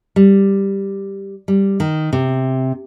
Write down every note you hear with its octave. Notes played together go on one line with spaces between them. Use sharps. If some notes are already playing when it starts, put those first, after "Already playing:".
G3
G3
D#3
C3